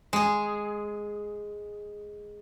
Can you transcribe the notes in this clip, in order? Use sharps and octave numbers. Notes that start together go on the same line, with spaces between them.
G#3 G#4